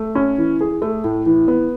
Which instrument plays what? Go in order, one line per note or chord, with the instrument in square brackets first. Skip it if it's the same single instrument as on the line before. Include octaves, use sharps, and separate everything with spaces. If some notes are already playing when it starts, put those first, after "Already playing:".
Already playing: [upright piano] A3
C#4
E3
G#4
A3
A2
E3
B3